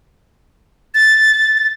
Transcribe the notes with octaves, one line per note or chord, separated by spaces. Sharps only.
A6